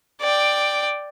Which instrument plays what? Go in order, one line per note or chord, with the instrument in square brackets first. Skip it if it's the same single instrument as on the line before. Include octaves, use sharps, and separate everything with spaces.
[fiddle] D5 G5